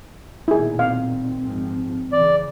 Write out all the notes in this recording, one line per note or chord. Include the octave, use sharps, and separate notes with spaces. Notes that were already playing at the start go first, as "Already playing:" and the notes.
B1 A#2 D#3 E4 G#4
C4 F5
G#2 F3
C#3 E3 D5